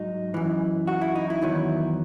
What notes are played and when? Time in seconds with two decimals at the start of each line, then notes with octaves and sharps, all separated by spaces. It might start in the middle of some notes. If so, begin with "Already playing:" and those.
Already playing: G#2 F#3 D#4
0.34 F#2 E3
0.87 F#4
1.01 E4
1.15 D#4
1.30 E4
1.42 E2 D#3 F#3